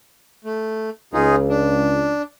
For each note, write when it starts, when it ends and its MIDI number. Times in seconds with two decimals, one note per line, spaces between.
0.45 0.90 57
1.13 2.16 37
1.13 2.16 49
1.13 1.36 63
1.13 1.36 65
1.13 1.36 68
1.49 2.22 62